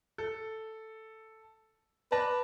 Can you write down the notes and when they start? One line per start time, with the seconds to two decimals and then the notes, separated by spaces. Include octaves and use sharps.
0.18 A4
2.12 B4 D5 A5 A#6